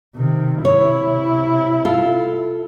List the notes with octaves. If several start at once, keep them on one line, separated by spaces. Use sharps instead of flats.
C3 D#3
C3 E4 C#5
F4 A4